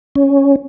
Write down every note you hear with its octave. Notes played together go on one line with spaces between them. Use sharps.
C#4